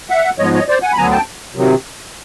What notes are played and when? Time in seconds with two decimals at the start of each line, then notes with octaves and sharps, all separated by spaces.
0.10 E5 F#5
0.39 G#2 F3 G#3 B3 C#5 D#5
0.53 C#5 D#5
0.68 C5 D5
0.82 F#5 G#5
0.93 B5
0.97 D2 D3 F#3 B3 G#5 A#5
1.11 G5 A5
1.55 C3 D#3 F#3